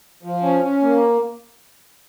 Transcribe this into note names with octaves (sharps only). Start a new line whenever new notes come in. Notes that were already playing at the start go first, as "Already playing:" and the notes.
F3
C#4
C#4
A#3